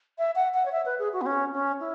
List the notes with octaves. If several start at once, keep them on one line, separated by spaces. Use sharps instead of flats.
E5
F#5
F#5
C#5
E5
B4
G#4
F#4
B3
C#4
C#4
E4